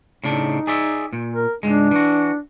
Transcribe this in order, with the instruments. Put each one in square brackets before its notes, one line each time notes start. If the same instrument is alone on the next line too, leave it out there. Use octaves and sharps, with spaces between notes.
[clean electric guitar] A2 C#3 D4 [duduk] D#4
[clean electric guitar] G#4 D5 E5
A#2
[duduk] A#4
[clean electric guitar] C#2 G#2 G#3 [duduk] D4
[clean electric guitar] E3 F#4